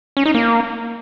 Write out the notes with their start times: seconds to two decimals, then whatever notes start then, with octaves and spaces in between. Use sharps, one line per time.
0.17 C#4
0.26 D#4
0.34 A#3